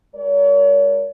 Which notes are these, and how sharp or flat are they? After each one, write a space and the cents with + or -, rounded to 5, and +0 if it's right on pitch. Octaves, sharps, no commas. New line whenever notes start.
G#3 -10 A#4 +0 C#5 +40